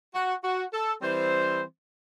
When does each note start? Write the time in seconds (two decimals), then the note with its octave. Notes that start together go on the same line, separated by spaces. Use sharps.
0.14 F#4
0.44 F#4
0.73 A4
1.02 E3 G3 C4 C5